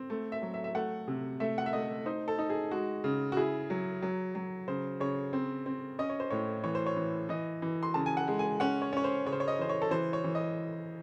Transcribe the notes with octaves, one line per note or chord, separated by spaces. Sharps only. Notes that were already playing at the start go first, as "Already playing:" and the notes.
Already playing: C4
A3
E5
F#3
E5
E5
A3 F#5
C3
A3 E5
F#5
E5
A3 D#5
D#4 C5
A4
D#4
G#4
G#3 F#4
C#3
F#4
E4 G#4
F#3
F#3
F#3
C#3 C5
C#3 C#5
C4
C4
C#4 D#5
C#5
C5
A2 C#5
E3 C#5
C5
C#5
E3
E3 D#5
E3
C6
C#3 A5
G#5
F#5
G#3
G#5
C#4 F#5
C#5
C#4 C#5
C5
C#3 C#5
C5
C#5
D#5
E3 C5
C#5
A4
E3 C5
C#5
E3
D#5